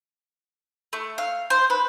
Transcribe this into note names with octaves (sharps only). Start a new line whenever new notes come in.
A3
F5
C5
B4